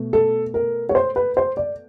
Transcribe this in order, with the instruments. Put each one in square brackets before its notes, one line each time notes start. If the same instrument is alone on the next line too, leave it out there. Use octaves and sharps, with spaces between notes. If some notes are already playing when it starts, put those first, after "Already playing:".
Already playing: [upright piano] B2 A3
A4
A#4
C#5
C5
B4
C5
D5